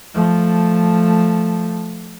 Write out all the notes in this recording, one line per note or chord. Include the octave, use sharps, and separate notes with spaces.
F3 A3